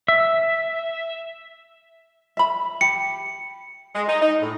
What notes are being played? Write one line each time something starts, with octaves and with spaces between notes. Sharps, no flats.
E5
E5 B5
G4 C#7
G#3
D#4
D#4
A2